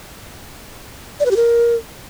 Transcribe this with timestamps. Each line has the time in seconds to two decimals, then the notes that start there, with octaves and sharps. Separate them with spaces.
1.20 D5
1.25 B4
1.31 G4
1.36 A#4